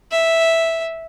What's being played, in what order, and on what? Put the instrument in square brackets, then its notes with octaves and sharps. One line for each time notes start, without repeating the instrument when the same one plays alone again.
[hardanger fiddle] E5